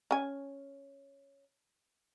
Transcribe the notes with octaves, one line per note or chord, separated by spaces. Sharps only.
C#4 G#5